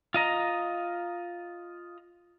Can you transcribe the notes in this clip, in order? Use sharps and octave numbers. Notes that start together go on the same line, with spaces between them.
F4 D#5 A#5